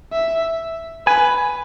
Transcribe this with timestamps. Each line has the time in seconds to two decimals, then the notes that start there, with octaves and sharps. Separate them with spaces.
0.12 E5
1.07 B4 G#5